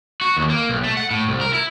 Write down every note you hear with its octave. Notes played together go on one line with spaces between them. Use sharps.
F#4
D#2
A#3
B1
A3
F#5
A2
C2
A#4
E4